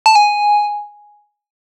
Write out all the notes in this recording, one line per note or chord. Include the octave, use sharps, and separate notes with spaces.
A5
G#5